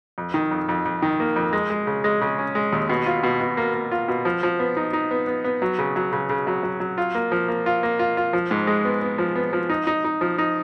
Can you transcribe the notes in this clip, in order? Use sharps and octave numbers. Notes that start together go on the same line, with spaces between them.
F2
D#3
F2
F2
F2
D#3
A#3
F2
G#3
G#3
C#3
G#3
C#3
C#4
G#3
D#2
B2
F4
B2
B2
A#3
A#3
F4
B2
F3
F3
B3
D#4
D#4
B3
B3
B3
F#3
C#3
F#3
C#3
C#3
F#3
F#3
F#3
F4
A#3
F3
A#3
F4
A#3
F4
F4
F3
G#2
G#3
B3
B3
F3
B3
F3
D#4
D#4
D#4
F3
D#4